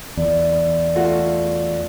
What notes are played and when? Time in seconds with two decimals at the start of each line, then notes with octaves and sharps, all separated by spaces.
0.17 E2 D5
0.96 A3 F4 F#4